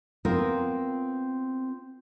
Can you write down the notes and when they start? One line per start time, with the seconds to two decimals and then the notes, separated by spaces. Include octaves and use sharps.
0.25 B3 C4 F4 A#4